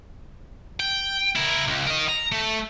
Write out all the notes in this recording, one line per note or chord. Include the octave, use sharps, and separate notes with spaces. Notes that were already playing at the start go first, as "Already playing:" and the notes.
G5
E4 A#4
C#2
A#4 D#5
A#5
A3